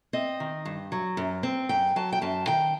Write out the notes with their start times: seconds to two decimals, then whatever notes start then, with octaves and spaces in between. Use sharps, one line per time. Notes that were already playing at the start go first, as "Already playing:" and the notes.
0.13 C4 D#5
0.40 D#3
0.65 G2
0.92 F#3
1.17 F#2
1.43 C4
1.69 F#2 G5
1.96 F#3 A5
2.12 G5
2.21 F#2 A5
2.47 D#3 G5